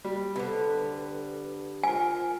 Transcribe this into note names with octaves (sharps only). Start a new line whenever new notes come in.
G3
D3 G3 B3 A4 B4 C5
F4 A#4 C5 G#5